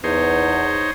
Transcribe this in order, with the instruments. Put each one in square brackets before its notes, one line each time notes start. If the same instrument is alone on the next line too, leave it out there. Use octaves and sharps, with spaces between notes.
[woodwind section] E2 [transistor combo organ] D#4 C5 C#5